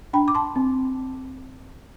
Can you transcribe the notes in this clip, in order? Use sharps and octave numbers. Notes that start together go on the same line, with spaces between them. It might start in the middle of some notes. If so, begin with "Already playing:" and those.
D4 G5 B5
D6
A5 C6
C4